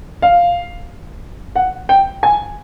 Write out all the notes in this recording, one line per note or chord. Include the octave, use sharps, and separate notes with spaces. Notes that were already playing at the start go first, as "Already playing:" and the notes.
F5
F#5
G5
G#5